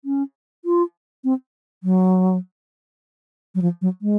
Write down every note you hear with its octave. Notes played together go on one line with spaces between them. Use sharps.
C#4
F4
C4
F#3
F#3
F3
F#3
G#3